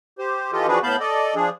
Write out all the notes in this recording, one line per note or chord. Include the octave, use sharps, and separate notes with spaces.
G4 C5
E3 F4 G4 A4 D#5
E3 F3 D4 F#4 G#4 B4
A2 B3 F5 A5 B5 G6
A4 D5 D#5
F3 D4 G#4